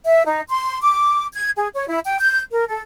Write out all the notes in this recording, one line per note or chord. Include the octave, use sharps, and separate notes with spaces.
E5
D#4
C6
D6
G#6
G#4
C#5
E4
G5
G6
A#4
A4